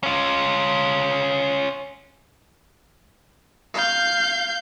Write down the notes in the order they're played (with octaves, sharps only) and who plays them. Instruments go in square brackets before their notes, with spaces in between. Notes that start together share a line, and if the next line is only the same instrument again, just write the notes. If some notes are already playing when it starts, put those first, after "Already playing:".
[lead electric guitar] C#4 F4
[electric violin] F5 G6